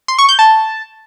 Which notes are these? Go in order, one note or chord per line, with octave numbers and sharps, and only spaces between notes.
C6
C#6
G6
A5